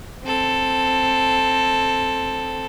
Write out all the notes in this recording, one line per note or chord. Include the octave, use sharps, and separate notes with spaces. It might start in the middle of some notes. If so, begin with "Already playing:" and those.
C4 A4